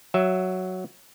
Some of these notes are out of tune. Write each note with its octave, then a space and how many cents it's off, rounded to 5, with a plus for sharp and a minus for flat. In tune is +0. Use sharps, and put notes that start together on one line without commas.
F#3 +0 E5 +0